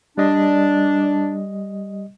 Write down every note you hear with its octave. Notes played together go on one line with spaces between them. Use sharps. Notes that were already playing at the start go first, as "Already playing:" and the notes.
G3 D4 D#5